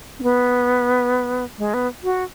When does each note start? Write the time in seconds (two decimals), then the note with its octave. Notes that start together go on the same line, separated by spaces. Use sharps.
0.19 C#4
0.23 B3
1.58 G#3
1.74 B3
2.04 F#4